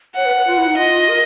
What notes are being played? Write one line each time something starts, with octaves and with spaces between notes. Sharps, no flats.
C#5 F#5
B4
B4
F4
E4
D#4
F4 D#5
A#4